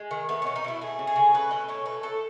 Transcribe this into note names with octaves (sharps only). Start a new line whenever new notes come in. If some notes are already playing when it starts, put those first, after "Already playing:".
Already playing: G#3
D#3
A3 B3
B2 C#4
D#4
B2 E4
A3 G#4
C#3
G#4
C#3
A3 B4
B2 D#5
B2 C#5
A3 B4
A2 A4